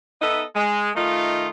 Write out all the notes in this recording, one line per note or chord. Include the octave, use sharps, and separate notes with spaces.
B3 D#4 A4 D#5 E5
G#3
D#3 A3 D#4 F4